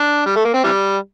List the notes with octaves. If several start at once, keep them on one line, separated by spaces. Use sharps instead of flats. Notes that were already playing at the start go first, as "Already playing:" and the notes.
Already playing: D4
G3
A3
A#3
C4
C3 E3 G3